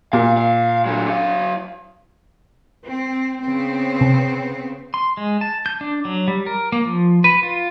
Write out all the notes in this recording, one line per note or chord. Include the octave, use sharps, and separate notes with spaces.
A#2 F5
F5
D3 F#3
F#3 F5
C4
C#3 B3 C4
C3
C6
G#3
A5
G6
D4
F#3
G3
A#4
A#3
F3
B4
F4